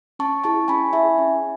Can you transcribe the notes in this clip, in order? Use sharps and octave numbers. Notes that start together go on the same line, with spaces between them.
C#4 A5 C#6
E4 G#4 A5 C#6
C#4 G#5 B5
E4 G#4 E5 G#5
C#4